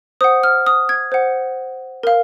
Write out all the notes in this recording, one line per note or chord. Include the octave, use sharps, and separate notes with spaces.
C5 F#5 D#6
F6
D#6
G#6
C5 F#5
A#4 F5